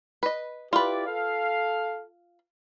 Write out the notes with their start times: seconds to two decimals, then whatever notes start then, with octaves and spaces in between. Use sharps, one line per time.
0.23 B4 D#5
0.73 E4 F4 G4 B4 D5
1.07 A4 F5